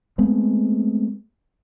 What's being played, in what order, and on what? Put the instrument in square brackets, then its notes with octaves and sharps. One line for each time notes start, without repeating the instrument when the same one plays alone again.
[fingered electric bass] G#3 A3 B3 C4